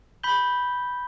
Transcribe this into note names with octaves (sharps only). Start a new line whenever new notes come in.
B5 G6 B6 G7